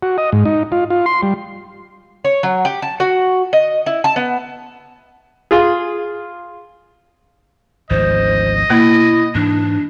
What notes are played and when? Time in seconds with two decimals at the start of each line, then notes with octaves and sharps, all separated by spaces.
0.03 F#4
0.18 D#5
0.32 G#2
0.45 D#4
0.72 F4
0.90 F4
1.06 C6
1.23 G3
2.25 C#5
2.43 F#3
2.65 G4
2.82 A5
3.00 F#4
3.53 D#5
3.86 E4
4.04 A5
4.16 B3
5.51 F4 G#4
7.90 G#1 D2 F3 C5 D#5
8.70 B2 A#3 E4
9.35 G#2 E3 D4